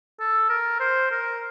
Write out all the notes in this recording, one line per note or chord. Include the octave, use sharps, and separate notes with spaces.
A4
A#4
C5
A#4